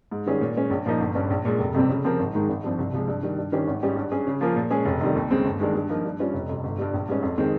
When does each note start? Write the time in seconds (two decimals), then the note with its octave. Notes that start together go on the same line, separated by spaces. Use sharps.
0.11 G#2
0.26 D#3 G3 C#4 G#4
0.41 A#2
0.56 G#3 C#4
0.70 A#1
0.86 A#2 F3 A#3 D#4
1.00 G1
1.15 G2 G3 C#4
1.30 A#1
1.45 A#2 G#3
1.59 F1
1.74 F2 C3 G3 C4
1.89 C#3
2.04 F3 C4 G4 A#4
2.19 G#1
2.34 G#2 D#3 G#3 D#4
2.49 G#1
2.64 G2 F3 C4
2.79 C2
2.93 C3 F3 G#3
3.07 G2
3.23 D#3 G3
3.38 G2
3.52 D#3 G3 C#4 G4
3.67 G#1
3.83 G#2 G3 C#4 G4
3.96 G2
4.12 G3 C#4 G#4
4.27 C#3
4.41 F3 A#3 F4 G#4
4.56 A#2
4.71 G#3 C#4 G#4
4.85 F1
5.00 F2 D#3 G3
5.16 D#2
5.31 C#3 G#3 C4
5.45 G1
5.60 G2 D#3 G#3
5.75 G2
5.89 F3 A#3 D#4
6.05 G2
6.19 G3 C#4 F4
6.34 F1
6.49 F2 C3
6.64 G1
6.78 G2 G3
6.94 A#1
7.08 G#2 G3 C#4
7.23 F2
7.38 D#3 G#3 C4